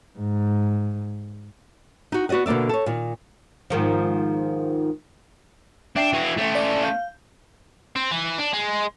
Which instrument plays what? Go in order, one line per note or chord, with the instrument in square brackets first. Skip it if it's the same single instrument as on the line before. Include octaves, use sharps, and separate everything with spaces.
[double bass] G#2
[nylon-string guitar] D#4 F#4
B3 F#4 D5 D#5 F#5
B2 D3 A#3 D5 E5
A4 C#5
A#2 D#3
[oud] G#2 D#3 F3
[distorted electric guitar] D4 [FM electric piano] E5 G5 C7
[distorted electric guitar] E3 F#4
A3 C#4
[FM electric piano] D5
F5 G6
[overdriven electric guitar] C4
E3
D4
G#3